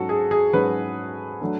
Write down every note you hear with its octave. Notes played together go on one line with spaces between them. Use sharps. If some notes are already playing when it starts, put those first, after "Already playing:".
Already playing: G#2 F#3 C#4 F#4 A4
G#4
G#4
G#2 F#3 C#4 B4
F#3 A3 D4